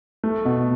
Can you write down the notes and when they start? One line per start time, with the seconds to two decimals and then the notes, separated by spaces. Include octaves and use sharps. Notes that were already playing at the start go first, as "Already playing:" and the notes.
0.24 A3
0.45 B2